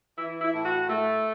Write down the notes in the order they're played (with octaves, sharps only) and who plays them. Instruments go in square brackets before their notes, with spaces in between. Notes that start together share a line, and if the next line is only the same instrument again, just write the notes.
[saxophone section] E3 E4
E4
A2
F#4
A3